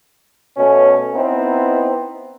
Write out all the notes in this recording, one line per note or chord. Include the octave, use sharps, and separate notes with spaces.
B2 A3 C#4
B3 C4 D#4 E4